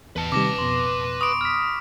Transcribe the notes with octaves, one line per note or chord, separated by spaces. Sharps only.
E2 B4 A5
C3 D#3 G3 D6 A#6
F2 B2 C6
B5 C#6 D#6 D7
F6 B6